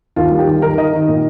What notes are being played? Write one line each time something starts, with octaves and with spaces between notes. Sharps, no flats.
D#2 F4
G3
G4
D#3
D#3 A#4
D#3 D#5
D#3
A#2